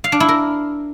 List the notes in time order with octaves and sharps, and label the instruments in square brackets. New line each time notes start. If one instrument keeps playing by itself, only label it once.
[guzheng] F5
D4
E4
A#4